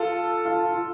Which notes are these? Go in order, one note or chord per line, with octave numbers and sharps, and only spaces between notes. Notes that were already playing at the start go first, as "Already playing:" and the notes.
Already playing: F4 A4
F4
F4